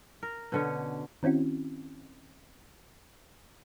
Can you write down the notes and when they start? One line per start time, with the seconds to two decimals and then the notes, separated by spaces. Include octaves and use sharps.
0.23 A#4
0.52 B2 D3 C#4
1.23 D#3 C4 C#4 E4 F#4